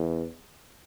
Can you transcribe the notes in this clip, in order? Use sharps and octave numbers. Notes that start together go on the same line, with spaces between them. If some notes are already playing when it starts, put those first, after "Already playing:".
Already playing: E2